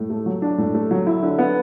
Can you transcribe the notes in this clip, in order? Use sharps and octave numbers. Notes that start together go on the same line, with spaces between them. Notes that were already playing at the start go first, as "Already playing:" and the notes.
Already playing: A2
A3
F#3
D4
A2
A3
F#3
E4
D3
B3